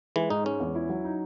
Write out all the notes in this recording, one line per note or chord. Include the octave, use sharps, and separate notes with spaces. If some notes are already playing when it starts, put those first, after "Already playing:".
E3 G#3
G#2 D#4
G#3 C#4
E2
E4
F#3
D#4